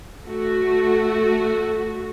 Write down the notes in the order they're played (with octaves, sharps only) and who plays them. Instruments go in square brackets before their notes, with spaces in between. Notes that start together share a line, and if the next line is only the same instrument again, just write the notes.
[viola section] A3 F#4